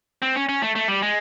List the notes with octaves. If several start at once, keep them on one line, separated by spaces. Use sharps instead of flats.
C4
C#4
C#4
A3
A3
G3
G#3